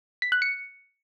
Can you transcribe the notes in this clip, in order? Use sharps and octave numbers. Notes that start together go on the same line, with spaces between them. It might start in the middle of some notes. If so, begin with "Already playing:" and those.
B6
F#6
C#7